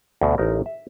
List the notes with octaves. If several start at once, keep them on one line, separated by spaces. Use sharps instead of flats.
D2 B2
A1 D#4 A#4
E5